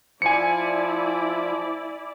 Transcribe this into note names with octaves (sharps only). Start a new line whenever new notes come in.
F3 E4 D5 G#5 C#7